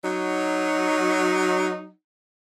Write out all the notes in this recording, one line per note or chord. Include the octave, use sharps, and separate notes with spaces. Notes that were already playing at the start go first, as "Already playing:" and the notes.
F#3 D#4